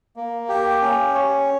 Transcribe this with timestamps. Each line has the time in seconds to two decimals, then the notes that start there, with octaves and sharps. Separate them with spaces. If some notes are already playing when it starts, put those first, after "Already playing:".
0.16 A#3
0.49 G4
0.82 C#4
1.15 C#5